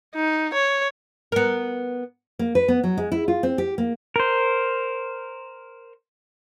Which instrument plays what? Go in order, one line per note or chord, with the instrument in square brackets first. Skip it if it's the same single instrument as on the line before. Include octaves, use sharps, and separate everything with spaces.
[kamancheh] D#4
C#5
[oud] B3 A#4
[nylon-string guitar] A#3
B4
B3
F#3
G#3
E4
F4
C4
G4
A#3
[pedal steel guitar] A#4 C5